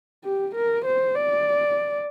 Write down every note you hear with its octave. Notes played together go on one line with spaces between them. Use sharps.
G4
A#4
C5
D5